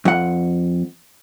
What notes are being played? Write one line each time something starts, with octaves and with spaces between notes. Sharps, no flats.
F2 F#5